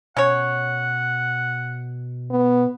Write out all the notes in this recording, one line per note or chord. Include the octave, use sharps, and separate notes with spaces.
B2 C#4 C#5 F#5
B3